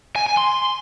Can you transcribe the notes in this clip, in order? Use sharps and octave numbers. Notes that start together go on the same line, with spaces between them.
G#5
G#5
C6